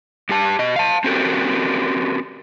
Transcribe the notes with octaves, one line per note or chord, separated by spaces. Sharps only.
G2 G4 A5
B2 D#5
F5 A5
C4 C#4 F#4 G4 A4 A#4